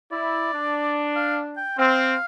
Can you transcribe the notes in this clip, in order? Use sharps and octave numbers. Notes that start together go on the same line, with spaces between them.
E4 D5
D4
F5
G5
C4 F5